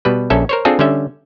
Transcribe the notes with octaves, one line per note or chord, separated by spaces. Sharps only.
B2 G3 B4
A#1 C#4 A4 E5
A#4 C5 C#5
C4 D4 F4 G#4 A4
D3 G3 C#4 E5